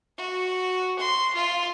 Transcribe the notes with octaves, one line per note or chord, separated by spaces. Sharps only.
F#4
C6
F4